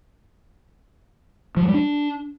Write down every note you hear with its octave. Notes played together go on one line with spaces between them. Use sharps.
F3
F#3
G3
D4